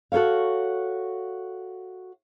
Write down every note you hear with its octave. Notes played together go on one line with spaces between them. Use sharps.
F#4 A4 C5 C#5 F5